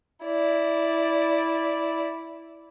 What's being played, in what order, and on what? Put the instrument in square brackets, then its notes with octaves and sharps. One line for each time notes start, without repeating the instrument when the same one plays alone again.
[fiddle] E4 D5